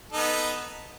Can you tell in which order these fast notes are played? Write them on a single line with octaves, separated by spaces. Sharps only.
A4 D#4 B3